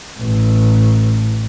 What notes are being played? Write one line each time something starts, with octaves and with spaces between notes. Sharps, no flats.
A1